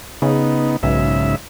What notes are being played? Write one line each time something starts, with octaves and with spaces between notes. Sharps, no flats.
C#3 B3 D#4
B1 G#2 C#3 E5